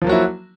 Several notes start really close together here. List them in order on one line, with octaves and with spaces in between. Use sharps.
F3 A#3 F#3 F#4 E4